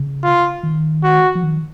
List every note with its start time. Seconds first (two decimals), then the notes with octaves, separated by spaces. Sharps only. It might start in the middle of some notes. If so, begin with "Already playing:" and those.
Already playing: C#3
0.24 F4
0.63 D#3
1.04 F#4
1.35 F3
1.44 D#3